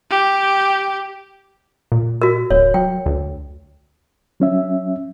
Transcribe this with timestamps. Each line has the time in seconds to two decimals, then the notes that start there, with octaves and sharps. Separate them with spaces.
0.11 G4
1.92 A#2
2.22 F#4 A#4
2.50 D1 C#5
2.74 F#3 G5
3.06 D2
4.40 F#3 C#4 E5